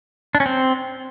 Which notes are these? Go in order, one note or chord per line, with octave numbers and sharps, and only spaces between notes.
D4
C#4
C4